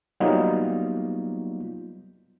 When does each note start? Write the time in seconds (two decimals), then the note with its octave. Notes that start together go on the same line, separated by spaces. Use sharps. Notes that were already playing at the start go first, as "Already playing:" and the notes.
0.20 F#3 G3 A#3 B3 D#4 F4